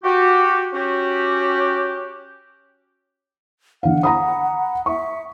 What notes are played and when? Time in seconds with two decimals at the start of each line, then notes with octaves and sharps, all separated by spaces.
0.04 F#4 G4
0.73 C#4 F#4 G4
3.83 D3 F5 F#5
4.03 A#5 B5 D#6
4.86 E5 C#6